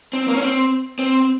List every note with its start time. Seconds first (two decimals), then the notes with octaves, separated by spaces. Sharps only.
0.13 C4
0.28 A#3
0.36 C#4
0.42 C4
0.99 C4